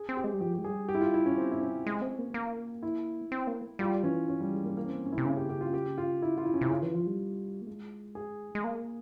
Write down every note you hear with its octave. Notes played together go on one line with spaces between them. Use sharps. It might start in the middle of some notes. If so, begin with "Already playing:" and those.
Already playing: G#4
C4
G4
G#3
G3
F3 G4
G#3 G4
G3 G#4
G4
E4
F4
E4
C#4
C4
E4
C#4
G#3
C4
A#3
A#3
E4
C4
A#3
G3 F4
E3 C#4
C#4
G3
G#3
A#3
A#3
C#4
C4
C#4
E4
C3
C#3 C#4
G4
G4
F4
G4
F4
E4
F4
E4
C#4
C3 E4
C#3 F4
E3
F3 F4
G3
A#3
G#3
G#4
G#3
A#3